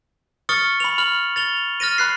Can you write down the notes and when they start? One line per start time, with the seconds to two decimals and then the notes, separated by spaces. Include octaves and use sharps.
0.49 C#6 D#6 F6 A6 C#7 G7
0.80 B5 F7
0.98 B5 F6 F#7
1.36 A6 F7 G7
1.80 F6 A6 A#6 D#7
1.98 B5 F#6 C7